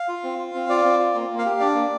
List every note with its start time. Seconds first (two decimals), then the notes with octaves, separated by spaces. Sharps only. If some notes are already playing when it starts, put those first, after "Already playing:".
Already playing: F5
0.08 F4
0.24 C4
0.38 F4
0.55 C4
0.69 F4 D5
0.85 C4
1.00 F4
1.15 A#3
1.30 A#3
1.38 F5
1.46 G4
1.60 D4 D5
1.75 A#3